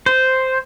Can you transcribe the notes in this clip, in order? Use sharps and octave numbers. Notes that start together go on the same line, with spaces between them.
C5